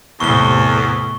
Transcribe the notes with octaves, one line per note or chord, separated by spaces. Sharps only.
E2 A2 C3 A3 C#6 G7